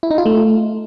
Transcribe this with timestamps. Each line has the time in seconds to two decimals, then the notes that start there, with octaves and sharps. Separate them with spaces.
0.03 E4
0.11 D#4
0.18 F4
0.26 A3